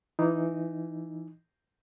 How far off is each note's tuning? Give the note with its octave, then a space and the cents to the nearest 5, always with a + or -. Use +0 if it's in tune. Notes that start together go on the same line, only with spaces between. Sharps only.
E3 +15 D#4 +0